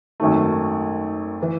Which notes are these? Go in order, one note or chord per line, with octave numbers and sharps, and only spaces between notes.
G#1 F#2 D#3 A3
E3